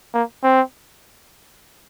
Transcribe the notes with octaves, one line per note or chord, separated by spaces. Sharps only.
A#3
C4